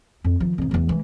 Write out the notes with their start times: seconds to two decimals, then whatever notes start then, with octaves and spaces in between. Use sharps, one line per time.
0.24 F2
0.40 D#3 F3
0.58 F2 D#3
0.71 E2 E3
0.89 E3 G#3